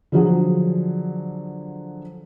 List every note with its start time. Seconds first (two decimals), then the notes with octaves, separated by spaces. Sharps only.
0.12 D3 F3 F#3 G#4